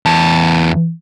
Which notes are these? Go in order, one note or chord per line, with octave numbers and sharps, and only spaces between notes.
E2 A5